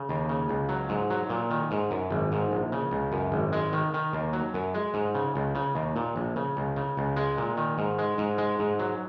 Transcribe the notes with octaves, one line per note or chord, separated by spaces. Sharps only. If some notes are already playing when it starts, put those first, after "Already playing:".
Already playing: C#3
D#2
C#3
C#2
F#3
G#2
F#3
A#2
D#3
G#2
F#2
G#1
G#2
A#1
C#3
C#2
F#2
G#1
G#3
D#3
D#3
D#2
F#3
F#2
G#3
G#2
C#3
C#2
C#3
D#2
A#2
A#1
C#3
C#2
C#3
C#2
G#3
A#2
D#3
G#2
G#3
G#2
G#3
G#2
F#3